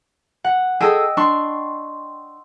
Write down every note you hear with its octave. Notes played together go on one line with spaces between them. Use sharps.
F#5
G#4 A4 D#5 G5 E6
D4 C6 C#6